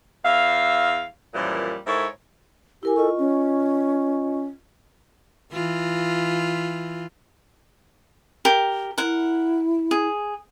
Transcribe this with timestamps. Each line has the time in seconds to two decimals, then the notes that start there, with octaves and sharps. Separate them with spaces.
0.24 E2 E5 F5
1.34 F#2 A#2 E3 F3 G3
1.86 G#2 E4 A4 A#4 C#5
2.83 E4 G4 A#4 G#5
2.96 F4 A4 D#5 C#6
3.18 C#4
5.53 E3 F4
8.45 G4 A#4
8.98 E4 A#4 F#5
9.91 G#4